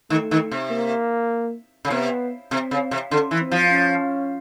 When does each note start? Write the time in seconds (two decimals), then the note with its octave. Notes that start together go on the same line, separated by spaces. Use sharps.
0.10 D#3 A3
0.31 D#3
0.51 C3
0.70 A#3
1.85 C#3
1.90 C3 B3
2.51 C3 C4
2.71 C#3
2.91 C3
3.11 D3 C#4
3.31 E3
3.41 C4
3.51 F3
3.71 C#4